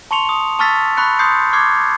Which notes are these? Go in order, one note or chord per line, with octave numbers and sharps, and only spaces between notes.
A5 C6 C#6 C#7 F7
D#6
A5 C#6 E6 F6 A6 B6
B5 C#6 F#6 C#7
C6 D#6 G6 C7 C#7
C#6 D6 F6 G#6 C7